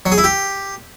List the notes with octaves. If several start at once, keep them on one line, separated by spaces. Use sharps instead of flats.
F#3
G#4
E4
G4